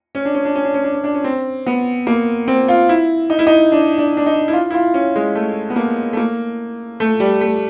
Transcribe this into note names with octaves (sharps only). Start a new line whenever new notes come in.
C#4
D4
C#4
D4
C#4
D4
C#4
D4
C#4
D4
C#4
C4
B3
A#3
C4
F4
E4
D#4
E4
D#4
D4
D4
D4
D#4
E4
F4
E4
F4
C#4
G#3
A3
B3
A#3
A3
A#3
A3
G3
A3